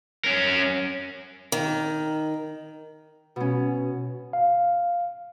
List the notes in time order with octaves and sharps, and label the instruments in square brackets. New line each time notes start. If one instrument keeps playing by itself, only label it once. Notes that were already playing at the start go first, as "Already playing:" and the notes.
[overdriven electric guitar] C#4 A#4
[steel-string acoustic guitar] D#3
[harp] B2 C#4
[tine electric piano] F5